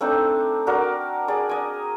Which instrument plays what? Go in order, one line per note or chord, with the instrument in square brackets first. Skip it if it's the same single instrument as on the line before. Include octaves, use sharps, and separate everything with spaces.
[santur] A3 C4 D4 D#4
D4 F#4 A#4 D5
G#4 D5
D#5 G#5